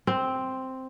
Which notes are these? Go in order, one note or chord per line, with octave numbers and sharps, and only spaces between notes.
C4